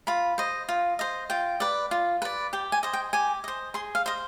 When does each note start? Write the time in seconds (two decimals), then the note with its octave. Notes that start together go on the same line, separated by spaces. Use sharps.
0.07 F4 B5
0.38 C5 D#5
0.69 F4
0.99 C5 D#5
1.30 F4 G5
1.60 B4 D5
1.91 F4
2.22 B4 D5
2.53 G4 G5
2.72 G#5
2.83 C5 D#5
2.93 G5
3.13 G4 G#5
3.44 C5 D#5
3.74 G#4 C6
3.95 F5
4.06 C5 D#5